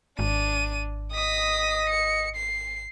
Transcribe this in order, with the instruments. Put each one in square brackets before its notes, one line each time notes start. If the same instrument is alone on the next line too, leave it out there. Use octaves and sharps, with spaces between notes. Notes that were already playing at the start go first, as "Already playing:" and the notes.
[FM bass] G#1 [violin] D4 D#7
[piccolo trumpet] D#5 [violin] D#6 B6
[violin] C#7
C7